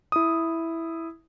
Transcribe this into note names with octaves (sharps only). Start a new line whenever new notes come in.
E4 D#6